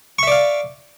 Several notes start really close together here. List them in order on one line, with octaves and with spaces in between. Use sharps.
C#6 E5 D5 F5